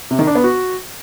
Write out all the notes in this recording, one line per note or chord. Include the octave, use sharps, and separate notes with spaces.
C3
D#3
D4
B3
F#4